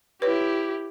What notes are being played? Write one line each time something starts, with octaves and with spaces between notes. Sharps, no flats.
E4 G4 B4 C#5